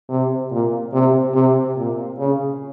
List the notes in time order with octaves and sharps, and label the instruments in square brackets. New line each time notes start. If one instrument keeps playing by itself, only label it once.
[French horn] C3
A#2
C3
C3
A#2
C#3